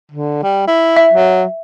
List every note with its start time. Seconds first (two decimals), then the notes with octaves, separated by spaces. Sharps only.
0.11 D3
0.43 G3
0.67 E4
0.97 E5
1.13 F#3